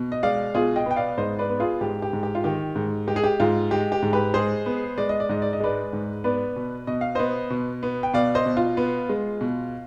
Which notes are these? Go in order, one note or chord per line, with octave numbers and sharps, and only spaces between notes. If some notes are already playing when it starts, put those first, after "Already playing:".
Already playing: B2
D#5
G#3 D5 F5
B2 F4 G#4
D#5 G5
B3 G5
D5 F5
G#2 C5 D#5
B4 D5
B3
F4 G#4
G#2 G4
G4
G#2
G4
F4
D#3 G4
G#2
G#3 G4
G#4
G4
G#2 F4
G#3 G4
G4
G#2
G4 B4
G#3 G#4 C5
B3
G#3 D5
D#5
D5
G#2 D#5
D5
D#5
G#3 B4 D5
G#2
B3 B4 D5
B2
B2 D#5
F5
B3 C5 D#5
B2
B3
G5
B2 D5 F5
C5 D#5
B2
F4
B3
G#3
B2